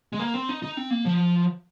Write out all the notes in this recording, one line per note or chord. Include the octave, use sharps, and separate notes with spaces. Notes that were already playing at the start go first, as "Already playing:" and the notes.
G#3
A#3
C4
D#4
D#4
C4
A#3
F3